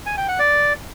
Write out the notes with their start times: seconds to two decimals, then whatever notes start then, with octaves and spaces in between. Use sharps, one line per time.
0.06 G#5
0.17 G5
0.28 F#5
0.39 D5